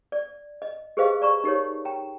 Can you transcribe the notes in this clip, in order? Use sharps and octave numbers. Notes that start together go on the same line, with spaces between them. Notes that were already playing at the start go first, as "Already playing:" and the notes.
D5
D#5
G4 G#4 B4 C5 D#5 F5
D5 A#5 C#6
D#4 G4 A#4 C#5
G5 A#5